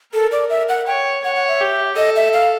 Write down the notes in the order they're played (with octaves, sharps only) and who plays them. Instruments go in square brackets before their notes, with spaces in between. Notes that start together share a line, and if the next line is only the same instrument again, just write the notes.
[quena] A4 [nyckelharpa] A#4
[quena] D5
E5
F#5
[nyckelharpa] C#5 [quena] G5
[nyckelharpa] C#5 [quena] F#5
[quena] F#5
E5
[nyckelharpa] G4
[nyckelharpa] A4 [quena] D#5
[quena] E5
F5